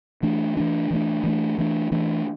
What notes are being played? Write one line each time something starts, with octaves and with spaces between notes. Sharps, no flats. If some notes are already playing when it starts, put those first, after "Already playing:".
E3 A3 D4
E3 A3 D4
E3 A3 D4
E3 A3 D4
E3 A3 D4
E3 A3 D4